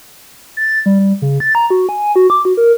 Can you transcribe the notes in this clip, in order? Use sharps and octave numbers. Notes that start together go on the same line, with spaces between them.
A6
G3
G3
C#3
A6
A#5
F#4
G#5
F#4
D6
F#4
A#4